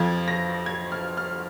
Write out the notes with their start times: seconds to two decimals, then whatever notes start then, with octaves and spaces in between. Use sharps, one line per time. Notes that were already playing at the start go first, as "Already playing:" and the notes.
Already playing: F2 F3 G#6
0.28 A#6
0.66 G#6
0.92 F6
1.17 F6